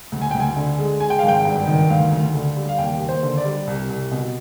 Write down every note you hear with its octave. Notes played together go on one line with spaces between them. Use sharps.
D2
G#5
D2 G5
G#5
D3
G#3
G#3 G#5
G5
G#1 F5
G5
G2
D#3
D2 F5
D2
D3
G3
F5
D#2 G5
D#2
C5
D3
D5
G3
C2
C2
B2